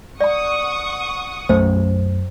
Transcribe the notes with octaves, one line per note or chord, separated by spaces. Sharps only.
D5 F#5 A#5 C#6 D#6
B1 F#2 A3 C#4 C5